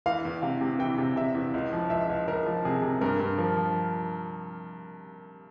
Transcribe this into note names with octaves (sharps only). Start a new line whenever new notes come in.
E3 F5
E2
C3 F5
C3
E3 G5
C3
C3 E5
E2
C#2
F3
C#2 E5
C#2
C#2 A#4
F3
C3 G#4
C3
G2 A#4
G2
F3 A#4
F3